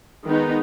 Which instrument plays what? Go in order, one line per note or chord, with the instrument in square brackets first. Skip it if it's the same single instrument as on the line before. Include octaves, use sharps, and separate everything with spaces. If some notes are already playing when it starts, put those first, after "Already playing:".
[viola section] D#3 G#3 B3 D#4